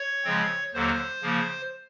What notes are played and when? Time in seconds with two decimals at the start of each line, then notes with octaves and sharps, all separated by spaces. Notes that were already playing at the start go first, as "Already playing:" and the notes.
Already playing: C#5
0.24 C#3 F3 G#3 C4
0.74 D#2 D3 F#3 A#3 C5
1.22 C#3 F3 A#3